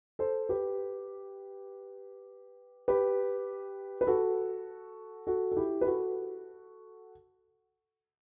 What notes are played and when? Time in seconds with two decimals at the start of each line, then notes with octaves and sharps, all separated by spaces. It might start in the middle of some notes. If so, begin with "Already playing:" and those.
0.19 A4 C5
0.49 G4 B4
2.88 G4 B4
4.01 B4
4.07 F#4 A4
5.27 F#4 A4
5.52 A4
5.57 E4 G4
5.81 B4
5.87 F#4 A4